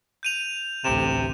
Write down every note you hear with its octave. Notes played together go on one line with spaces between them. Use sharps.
G6 D#7 F7
A1 D2 C3 E7